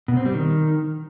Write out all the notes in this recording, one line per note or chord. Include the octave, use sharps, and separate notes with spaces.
B2
C4
G3
D#3